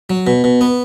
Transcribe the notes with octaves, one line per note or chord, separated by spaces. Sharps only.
F#3
B2
B2
B3